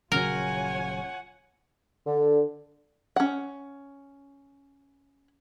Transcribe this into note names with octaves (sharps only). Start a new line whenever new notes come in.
D#1 C#3 F#3 F4 A#4 C#5 F#5 G#5
D3
C#4 F#5